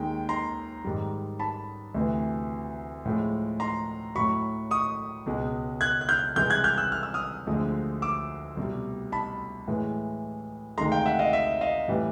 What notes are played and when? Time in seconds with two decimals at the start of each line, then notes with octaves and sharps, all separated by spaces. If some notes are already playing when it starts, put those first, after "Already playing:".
Already playing: D#2 D#3 G#3 G5
0.29 A#5 C6
0.85 G#2 D#3 G3
1.39 A5 B5
1.94 D2 C3 E3
3.05 A2 F3 G#3
3.60 A#5 C6
4.15 A2 F#3 B5 C#6
4.71 C#6 D#6
5.26 C#2 B2 G#3
5.81 F#6 G#6
6.01 F#6
6.09 F6 G6
6.36 C2 C3 E3 G#3 F6 G6
6.50 F#6 G#6
6.64 F6 G6
6.78 E6 F#6
6.92 F6
7.03 E6
7.14 D#6 F6
7.47 D2 D3 F3 G#3
8.02 D6 E6
8.57 C2 B2 G3
9.12 A5 B5
9.68 A2 E3 G#3
10.77 D2 C3 D#3 G#3 A#5 C6
10.92 F5 G5
11.06 E5 F#5
11.19 D#5 F5
11.33 E5
11.61 D#5 F5
11.88 A2 E3 G3